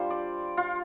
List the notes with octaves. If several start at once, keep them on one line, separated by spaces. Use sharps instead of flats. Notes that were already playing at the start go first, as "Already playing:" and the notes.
Already playing: G3 D4 F4 C5
D5
F4